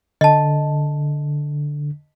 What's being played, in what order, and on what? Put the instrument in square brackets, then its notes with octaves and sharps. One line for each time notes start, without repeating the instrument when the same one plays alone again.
[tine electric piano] D3 [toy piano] D#5 A5